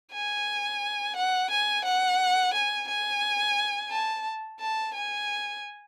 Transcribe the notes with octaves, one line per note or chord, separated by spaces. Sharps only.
G#5
F#5
G#5
F#5
G#5
G#5
A5
A5
G#5